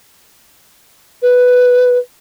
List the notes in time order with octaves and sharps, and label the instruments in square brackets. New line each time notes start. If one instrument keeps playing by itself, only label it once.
[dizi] B4